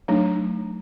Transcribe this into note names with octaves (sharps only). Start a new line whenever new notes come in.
F#3 A3 D4 D#4